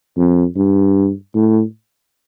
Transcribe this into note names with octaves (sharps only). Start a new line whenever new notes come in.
F2
G2
A2